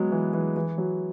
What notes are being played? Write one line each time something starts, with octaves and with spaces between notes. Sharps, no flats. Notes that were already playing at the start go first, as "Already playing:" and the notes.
Already playing: F#3 G#3 B3
E3
E3
E3
F#3